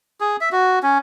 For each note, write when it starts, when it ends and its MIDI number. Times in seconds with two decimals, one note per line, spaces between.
0.20 0.37 68
0.41 0.49 76
0.52 0.79 66
0.83 0.98 61